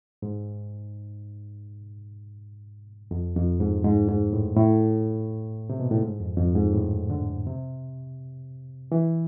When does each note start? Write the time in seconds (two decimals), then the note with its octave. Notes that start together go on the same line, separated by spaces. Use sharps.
0.22 G#2
3.11 F2
3.36 F2
3.60 G#2
3.84 G#2
4.08 G#2
4.33 A2
4.57 A2
5.70 C3
5.80 B2
5.91 A2
6.02 G#2
6.20 F2
6.38 F2
6.55 G#2
6.74 A2
7.10 D3
7.47 C3
8.92 E3